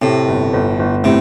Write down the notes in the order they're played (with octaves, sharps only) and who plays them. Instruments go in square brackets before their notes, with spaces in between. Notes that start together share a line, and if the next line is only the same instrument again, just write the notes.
[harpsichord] A2 [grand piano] C3
[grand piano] G1
G1
G1
[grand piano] A2 [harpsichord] C3